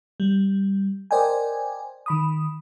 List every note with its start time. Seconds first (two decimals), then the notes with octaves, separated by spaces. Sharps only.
0.20 G3
1.11 A#4 C5 D5 D#5 G5 G#5
2.06 D#3 B5 D#6